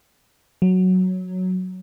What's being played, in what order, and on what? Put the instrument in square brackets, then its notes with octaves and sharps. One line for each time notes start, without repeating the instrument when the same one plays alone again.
[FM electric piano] F#3